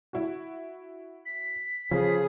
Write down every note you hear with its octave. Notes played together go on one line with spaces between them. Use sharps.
E4 F#4
B6
C#3 F3 G#4